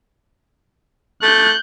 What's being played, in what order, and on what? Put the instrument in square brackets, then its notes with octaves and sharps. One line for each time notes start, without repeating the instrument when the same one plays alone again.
[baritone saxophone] A3 [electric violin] F#6 G6